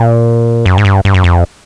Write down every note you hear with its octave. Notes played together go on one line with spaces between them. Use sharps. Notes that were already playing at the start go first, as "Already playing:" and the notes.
Already playing: A#2
F#2
G#2
G2
G2
F#2
F2